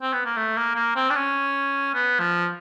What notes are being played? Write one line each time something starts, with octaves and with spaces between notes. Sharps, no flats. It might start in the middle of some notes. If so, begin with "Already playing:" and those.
C4
B3
A#3
A3
A#3
A#3
C4
D4
C#4
B3
F3